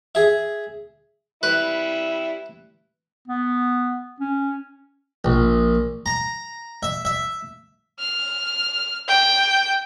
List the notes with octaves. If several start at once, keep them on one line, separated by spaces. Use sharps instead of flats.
G#4 E5
G3 E4 B4
B3
C#4
A#1
A#5
E5
E5
F6
G5